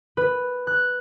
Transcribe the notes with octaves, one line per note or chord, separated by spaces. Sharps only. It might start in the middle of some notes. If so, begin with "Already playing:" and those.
B4
F#6